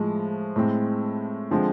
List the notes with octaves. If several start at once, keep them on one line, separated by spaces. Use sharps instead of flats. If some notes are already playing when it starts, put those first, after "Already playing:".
Already playing: A2 F3 G#3
A2 G#3 C4
D3 F3 G#3 C4